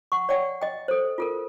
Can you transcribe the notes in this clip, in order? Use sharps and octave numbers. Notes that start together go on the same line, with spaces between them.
F#5 C#6
C#5 D5 F#5 G5
D#5 G5
A4 C5
F4 A4 A#4